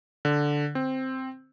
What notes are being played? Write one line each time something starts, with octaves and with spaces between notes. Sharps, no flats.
D3
C4